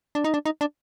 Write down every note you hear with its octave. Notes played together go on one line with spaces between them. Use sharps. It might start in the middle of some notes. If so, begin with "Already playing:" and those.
D4
D#4
D4
D#4
D4